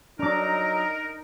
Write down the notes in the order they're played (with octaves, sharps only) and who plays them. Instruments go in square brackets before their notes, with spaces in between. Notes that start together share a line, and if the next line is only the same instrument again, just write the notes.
[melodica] F#3 A#5 [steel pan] D4 D6 [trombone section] D#4 [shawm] A#4